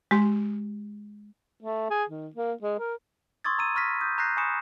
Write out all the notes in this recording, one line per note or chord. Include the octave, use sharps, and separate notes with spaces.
G#3 G4 C6
A3
G#4
D#3
A#3
G#3
A#4
C6 C#6 D#6 E6 G#6 A6
A#5 E6 D#7
B5 C#6 F6 A#6 B6
D#6 G6
A#5 F#6 G6 A#6 C7
G#5 B5 C#6 D#6 C#7 E7